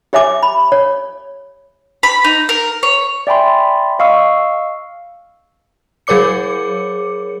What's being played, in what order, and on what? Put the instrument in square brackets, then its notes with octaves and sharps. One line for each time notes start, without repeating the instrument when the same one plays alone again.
[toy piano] G4 C#5 E5 G#5 D6
B5
C#5
[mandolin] B5
D#4
A#4
C#5
[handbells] D5 E5 G5 G#5 B5 C6
D#5 F5 C#6 E6
[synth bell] F#3 G#4 A#4 C#5 D6 C#7